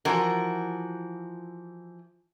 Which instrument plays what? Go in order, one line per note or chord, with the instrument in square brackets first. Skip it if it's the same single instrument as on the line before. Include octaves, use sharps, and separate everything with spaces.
[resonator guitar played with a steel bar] E3 F3 F#4 A#4